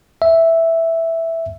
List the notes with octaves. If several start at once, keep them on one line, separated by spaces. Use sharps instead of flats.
E5